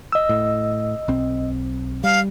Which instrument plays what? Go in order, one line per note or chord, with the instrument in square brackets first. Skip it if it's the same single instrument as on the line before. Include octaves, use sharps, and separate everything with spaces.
[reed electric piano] D#5 E6
[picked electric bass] A2
B1 C4
[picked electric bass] G3 [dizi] F5